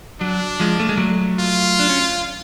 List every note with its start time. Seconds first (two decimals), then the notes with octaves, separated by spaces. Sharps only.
0.21 F#3 D4
0.60 F3 G#3
0.80 A3
0.89 G#3
0.97 F#3 A3
1.39 F4
1.79 D4
1.89 C#4